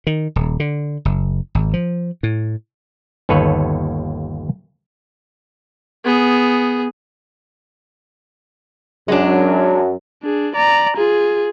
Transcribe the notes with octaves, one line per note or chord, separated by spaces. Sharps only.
D#3
D#1
D3
F#1
G#1
F3
A2
G1 D#2 A4 B4 C#5
B3 G#4
F#2 F#3 G#3 D4
D4 G#4
D5 A#5
F4 G#4